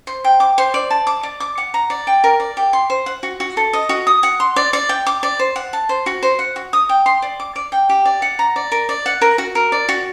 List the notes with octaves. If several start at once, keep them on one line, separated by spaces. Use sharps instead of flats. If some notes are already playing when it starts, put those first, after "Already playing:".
C5
G5
D6
C5
D5
A5
D6
D5
D6
F#5
A#5
D5
G5
A#4
D5
G4
C6
C5
F#5
F#4
F#4
A4
D#5
F#4
D#6
F#5
C6
D5
D5
G5
D6
D5
C5
F#5
A5
C5
F#4
C5
F#5
F#4
D#6
G5
C6
D5
D6
D5
G5
G4
D5
F#5
A#5
D5
A#4
D5
F#5
A#4
F#4
A#4
D5
F#4